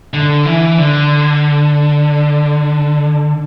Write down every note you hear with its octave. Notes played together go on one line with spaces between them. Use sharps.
D3
E3
D3